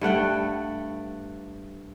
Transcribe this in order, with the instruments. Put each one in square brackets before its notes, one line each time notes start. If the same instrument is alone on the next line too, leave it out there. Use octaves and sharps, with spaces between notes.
[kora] G2 A3 F#5 G5